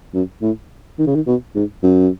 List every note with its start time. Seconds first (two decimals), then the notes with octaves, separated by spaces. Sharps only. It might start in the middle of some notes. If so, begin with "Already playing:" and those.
0.14 F#2
0.42 A2
0.99 D#3
1.06 C#3
1.15 D#3
1.26 B2
1.55 G#2
1.83 F#2